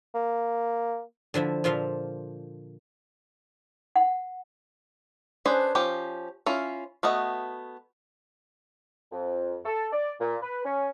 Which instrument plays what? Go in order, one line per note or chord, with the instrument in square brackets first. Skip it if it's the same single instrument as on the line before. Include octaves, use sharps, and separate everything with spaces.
[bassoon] A#3
[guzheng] D3 F3 E4 E5
A#2 F3 F4 E5 F5
[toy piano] F#5
[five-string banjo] C#4 D4 G#4 B4 C5
F3 C#4 G4
C#4 E4 F4
A3 B3 F#4 D#5
[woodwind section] F2
A4
D5
A#2
B4
C#4